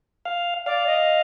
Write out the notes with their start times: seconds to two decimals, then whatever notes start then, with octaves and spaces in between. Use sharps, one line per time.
0.26 F5
0.66 D5 F5
0.86 D#5